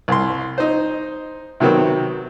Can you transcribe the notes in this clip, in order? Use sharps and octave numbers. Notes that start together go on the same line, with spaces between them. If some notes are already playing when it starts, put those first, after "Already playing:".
C2 C6
D#4 C5
C3 D#3 F#3 B3 C4